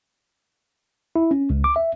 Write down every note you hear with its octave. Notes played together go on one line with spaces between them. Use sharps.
E4
C#4
C#2
D6
E5